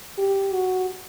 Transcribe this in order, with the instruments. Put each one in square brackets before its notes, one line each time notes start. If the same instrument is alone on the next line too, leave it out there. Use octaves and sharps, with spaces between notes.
[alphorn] G4
F#4